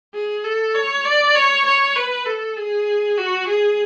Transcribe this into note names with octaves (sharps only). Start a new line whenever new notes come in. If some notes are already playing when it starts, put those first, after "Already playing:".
G#4
A4
C#5
D5
C#5
C#5
B4
A4
G#4
F#4
G#4